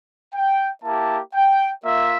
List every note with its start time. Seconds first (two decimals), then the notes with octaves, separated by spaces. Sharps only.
0.34 G5
0.84 A#3 E4 G4 A5
1.35 G5
1.85 A#3 F4 E5